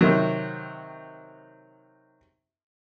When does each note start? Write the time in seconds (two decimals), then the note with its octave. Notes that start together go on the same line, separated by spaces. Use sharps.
0.01 C3 D#3 F#3